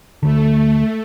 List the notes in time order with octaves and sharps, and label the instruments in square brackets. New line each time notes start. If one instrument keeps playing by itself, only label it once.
[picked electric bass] D2 D3 [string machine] A3